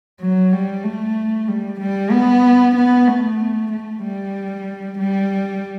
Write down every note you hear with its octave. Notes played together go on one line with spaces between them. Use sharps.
F#3
G3
A3
G3
G3
B3
B3
A3
A3
G3
G3